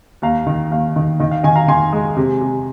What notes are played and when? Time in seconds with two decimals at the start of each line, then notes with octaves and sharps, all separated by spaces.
0.22 D#2 F5 A#5
0.47 D#3
0.71 D#2 F5
0.96 D#3
1.20 D#3 D#5
1.31 F5
1.43 D#3 D#5 G#5
1.56 F5 A#5
1.68 D#3 G#5 C6
1.93 G#3
2.17 C3
2.41 C3